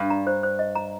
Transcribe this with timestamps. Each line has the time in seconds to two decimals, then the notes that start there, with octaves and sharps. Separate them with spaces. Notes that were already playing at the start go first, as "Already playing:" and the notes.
Already playing: G2
0.10 A#5
0.27 C5
0.43 C5
0.59 D#5
0.75 A#5